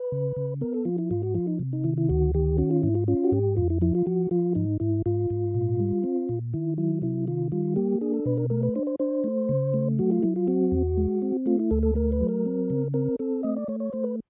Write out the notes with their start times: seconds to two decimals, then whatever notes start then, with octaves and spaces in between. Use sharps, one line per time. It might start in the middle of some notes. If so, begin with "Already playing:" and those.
Already playing: B4
0.12 C#3
0.36 C#3
0.61 B3 A#4
0.74 A4
0.85 F3 F4
0.98 E4
1.11 G#2 F4
1.23 F#4
1.35 F3 F4
1.47 D#4
1.59 C3
1.73 D#4
1.84 D#3 E4
1.97 E4
2.09 D2 F#4
2.34 D#3 G4
2.58 C#4 F#4
2.71 F4
2.83 G#2 E4
2.95 F4
3.08 C#4 F4
3.24 F#4
3.32 G#2 G4
3.57 F2 F4
3.70 E4
3.81 F3 E4
3.95 F4
4.07 F3 F#4
4.31 F3 F4
4.55 G#2 D#4
4.80 G#2 E4
5.06 G#2 F4
5.30 G#2
5.54 A#2
5.79 G3
6.04 C4
6.29 A#2
6.54 D#3 E4
6.78 F#3 E4
7.02 C3 E4
7.27 D#3 F4
7.52 G3 F4
7.76 A#3 G4
8.01 D4 G#4
8.14 A4
8.26 B2 B4
8.38 A#4
8.50 A3 A#4
8.63 B4
8.76 D4 C5
8.87 C5
8.99 D4 C5
9.24 A3
9.49 C#3
9.74 A3
9.99 F#3 F#4
10.11 F4
10.23 F#3 E4
10.36 F4
10.48 C4 F#4
10.72 E2
10.97 G#3
11.22 C4
11.46 A3 F4
11.59 E4
11.71 D2 A4
11.83 A4
11.95 A3 A#4
12.12 B4
12.20 F#3
12.29 A#4
12.46 C4
12.70 C#3
12.94 C4 A#4
13.19 C4 A4
13.43 A3 D#5
13.56 D5
13.68 A3 C#5
13.80 C#5
13.93 A3 C5
14.04 B4